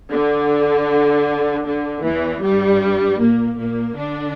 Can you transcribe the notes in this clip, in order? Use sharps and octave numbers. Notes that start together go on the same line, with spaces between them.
D3
D3
E2 E3
G2 G3
A#2 A#3
A#2 A#3
D3 D4